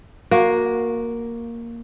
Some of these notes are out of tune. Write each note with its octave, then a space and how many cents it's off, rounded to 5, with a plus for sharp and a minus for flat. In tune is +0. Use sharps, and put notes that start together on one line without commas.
A#3 +0 F#4 -20